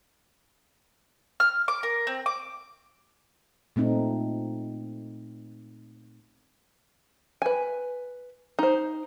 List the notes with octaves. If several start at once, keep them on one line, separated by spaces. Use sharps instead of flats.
F6
D6
A#4
C4
D6
A#2 A3 C4 D#4
B4 G#5
D#4 C5